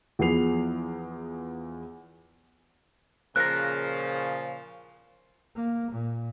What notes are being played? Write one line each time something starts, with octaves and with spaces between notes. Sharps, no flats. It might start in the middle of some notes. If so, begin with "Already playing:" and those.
E2 F3 B3 G#4 C7 F7
A#2 C#3 F3 A#4 A#5 F#6
A#3
A#2